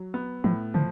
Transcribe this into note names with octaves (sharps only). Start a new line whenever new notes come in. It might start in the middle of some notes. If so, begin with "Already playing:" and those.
Already playing: F#3
B3
A2 F3
D3 F3